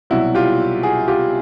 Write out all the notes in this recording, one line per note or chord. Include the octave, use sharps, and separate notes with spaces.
C2 B2 F#3 E4 F#4
F4 G4
F#4 G#4
F4 G4